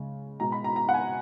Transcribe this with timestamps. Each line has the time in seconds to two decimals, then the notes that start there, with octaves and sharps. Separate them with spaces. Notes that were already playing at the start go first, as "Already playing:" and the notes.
Already playing: C#3 G#3
0.40 B2 G#3 A#5
0.52 B5
0.64 A#5
0.76 A#5
0.89 F#5
0.94 G#5